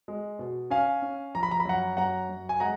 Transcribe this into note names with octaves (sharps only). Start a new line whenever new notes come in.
G#3
B2
C#4 F5 G#5
C#4
F3 A#5
B5
A#5
B5
F#2 F#5 A#5
F#2 F#5 A#5
F#2
G#5
G#3 F#5 A#5